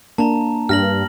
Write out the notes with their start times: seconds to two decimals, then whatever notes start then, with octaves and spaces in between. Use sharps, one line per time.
0.18 A#3 D4 A5 A#5
0.69 G2 F6 A#6 F#7